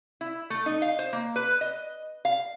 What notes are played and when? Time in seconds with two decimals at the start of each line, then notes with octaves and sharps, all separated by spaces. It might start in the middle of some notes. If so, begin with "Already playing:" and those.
0.21 E4
0.50 A3
0.66 D#4
0.82 F5
0.99 C5
1.13 A#3
1.36 B4
1.61 D#5
2.25 F5